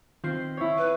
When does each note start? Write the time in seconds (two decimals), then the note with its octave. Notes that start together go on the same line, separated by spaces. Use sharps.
0.24 D#3 C4 F4 C7
0.57 E4 C#5
0.78 B4